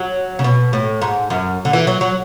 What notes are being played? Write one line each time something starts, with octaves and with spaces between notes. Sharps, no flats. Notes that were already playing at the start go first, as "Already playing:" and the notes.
Already playing: F#3
C#3
B2
A2
G#2
F#2
D3
E3
F#3
F#3